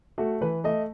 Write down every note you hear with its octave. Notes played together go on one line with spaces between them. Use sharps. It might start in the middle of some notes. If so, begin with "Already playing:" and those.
A3 F#4
E3 B4
A3 D#5